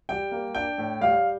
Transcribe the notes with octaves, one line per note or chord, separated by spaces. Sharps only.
G3 G5
A#3
D4 G5
A2
G3 F5